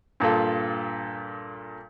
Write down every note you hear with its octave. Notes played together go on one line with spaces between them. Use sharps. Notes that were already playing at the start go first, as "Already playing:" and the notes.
G2 A#2 F4 A4